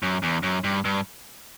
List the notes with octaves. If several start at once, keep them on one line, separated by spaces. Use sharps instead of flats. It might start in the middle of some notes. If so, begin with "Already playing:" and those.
F#2
E2
F#2
G2
G2